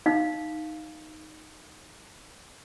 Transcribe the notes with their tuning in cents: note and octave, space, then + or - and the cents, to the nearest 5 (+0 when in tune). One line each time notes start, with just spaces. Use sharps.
D#4 +0 F5 +0